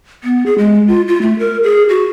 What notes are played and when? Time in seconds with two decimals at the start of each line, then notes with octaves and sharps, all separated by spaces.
0.24 B3
0.46 G#4
0.58 G#3
0.87 F4
1.08 F4
1.22 A3
1.39 A#4
1.63 G#4
1.89 F#4